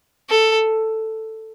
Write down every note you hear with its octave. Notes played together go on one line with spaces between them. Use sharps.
A4